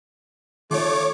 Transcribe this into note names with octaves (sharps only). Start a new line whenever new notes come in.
D#3 A3 F4 C#5 D6